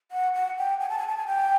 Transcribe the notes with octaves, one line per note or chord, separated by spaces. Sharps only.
F#5
F#5
G5
G#5
A5
G#5
A5
G#5
G5